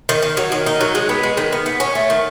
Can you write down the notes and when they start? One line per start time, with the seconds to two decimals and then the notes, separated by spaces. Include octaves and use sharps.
0.09 D#3
0.22 D#3
0.37 F#3
0.52 D#3
0.66 D#4
0.81 F#3
0.95 G#3
1.09 B3
1.23 G#3
1.37 D#3
1.53 B3
1.66 B3
1.80 C#4
1.95 A3
2.10 D#3